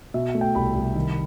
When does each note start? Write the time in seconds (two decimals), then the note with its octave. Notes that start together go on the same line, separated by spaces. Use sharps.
0.14 B2 E5
0.35 A3
0.41 G5
0.55 C2 B5
0.75 C2
0.96 D#3